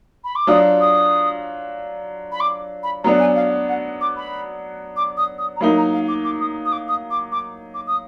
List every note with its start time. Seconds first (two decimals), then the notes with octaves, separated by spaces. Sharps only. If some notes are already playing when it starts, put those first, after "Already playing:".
0.24 B5
0.36 D6
0.47 F#3 D4 F4 D#6
0.80 D#6
2.32 B5
2.40 D6
2.83 B5
3.04 F#3 B3 D4 A#5
3.20 G#5
3.36 F5
3.68 F#5
4.01 D6
4.16 B5
4.96 D6
5.17 D#6
5.39 D#6
5.56 A#5
5.61 F#3 A#3 D#4 B5
5.77 A#5
5.93 F5
6.08 D6
6.24 D6
6.41 D#6
6.65 D#6
6.72 D6
6.88 D#6
7.10 D6
7.32 D6
7.74 D6
7.87 D#6